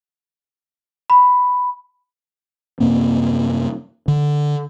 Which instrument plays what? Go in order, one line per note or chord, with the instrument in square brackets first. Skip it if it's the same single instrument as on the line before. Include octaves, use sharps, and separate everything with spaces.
[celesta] B5
[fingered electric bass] F#2 C3 A#3 C4
D3